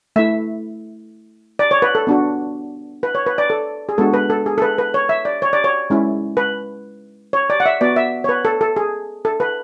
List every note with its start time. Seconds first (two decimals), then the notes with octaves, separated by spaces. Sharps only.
0.16 A3 E4 E5
1.59 D5
1.71 C#5
1.82 B4
1.95 A4
2.07 B3 D4 F#4
3.03 B4
3.15 C#5
3.27 B4
3.38 D5
3.50 A4
3.89 G#4
3.98 G#3 B3 D4 F#4 A4
4.14 B4
4.30 A4
4.46 G#4
4.58 A4
4.62 B4
4.78 B4
4.94 C#5
5.09 E5
5.25 D5
5.42 C#5
5.53 D5
5.64 C#5
5.90 G#3 C#4 E4
6.37 B4
7.33 C#5
7.50 D5
7.60 F#5
7.66 E5
7.81 B3 F#4 D5
7.96 E5
8.24 C#5
8.29 B4
8.45 A4
8.61 A4
8.77 G#4
9.25 A4
9.40 B4